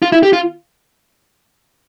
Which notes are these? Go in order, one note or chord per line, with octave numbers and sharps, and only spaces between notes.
F4
E4
G4
F4